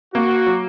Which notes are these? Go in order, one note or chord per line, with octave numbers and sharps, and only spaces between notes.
A#3 F#4
F#3